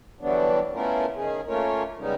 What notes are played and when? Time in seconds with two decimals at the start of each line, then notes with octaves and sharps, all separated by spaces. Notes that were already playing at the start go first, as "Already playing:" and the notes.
0.21 D3 E3 F#3 G3 B3 D4
0.73 A3 B3 C#4 E4 F4 A#4
1.16 D#3 C#4 G#4
1.47 A3 A#3 C#4 F4 A#4 C#5
1.99 C#3 G3 G#3 B3 C#4 D#4